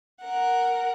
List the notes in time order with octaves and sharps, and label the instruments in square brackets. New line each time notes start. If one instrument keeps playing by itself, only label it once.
[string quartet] A#4 F#5